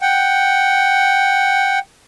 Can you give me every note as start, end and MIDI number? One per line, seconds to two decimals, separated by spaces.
0.01 1.79 78
0.01 1.79 79